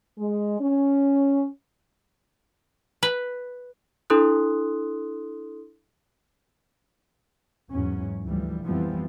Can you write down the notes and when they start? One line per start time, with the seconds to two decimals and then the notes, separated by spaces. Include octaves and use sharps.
0.17 G#3
0.60 C#4
3.03 B4
4.10 D4 E4 A4 C6 D#6 F#6
7.71 E2 G#2 F#3 C#4
8.24 D2 E3 F3 G3
8.65 F2 E3 F3 G3 B3 C4